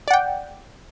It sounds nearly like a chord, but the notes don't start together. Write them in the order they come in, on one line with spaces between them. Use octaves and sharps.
D5 F#5 G5